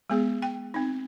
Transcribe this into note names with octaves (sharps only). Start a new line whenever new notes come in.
G#3 B3 G#4
G5
C4 D#4